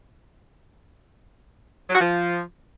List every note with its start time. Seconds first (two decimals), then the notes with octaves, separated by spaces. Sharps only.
1.89 F#3
1.95 F#4
2.00 F3